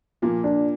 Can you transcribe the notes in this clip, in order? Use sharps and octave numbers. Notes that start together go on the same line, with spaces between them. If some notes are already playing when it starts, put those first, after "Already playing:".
A#2 F3 A#3
D4